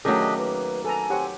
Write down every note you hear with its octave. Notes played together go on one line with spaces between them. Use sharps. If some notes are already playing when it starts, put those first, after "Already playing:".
D#3 F#3 A3 C#4 D4 G4 G#4 D#5
A#3 B4
A4 B4 G#5 A#5
C4 G4 C#5 F#5